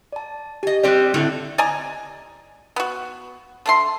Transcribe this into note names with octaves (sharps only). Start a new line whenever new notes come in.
D5 A5
G4 D#5 G#5
G3 C4 G4 D5 F#6
A2 D3 A3 C4 E4
D5 D#5 G#5 A#5
B3 F#4
D3 A3 C6